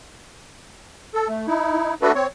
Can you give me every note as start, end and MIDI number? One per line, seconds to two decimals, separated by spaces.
1.14 1.28 69
1.29 1.47 57
1.47 1.94 63
1.47 1.94 64
2.02 2.12 57
2.02 2.12 62
2.02 2.12 66
2.02 2.12 69
2.02 2.12 71
2.15 2.27 60
2.15 2.27 73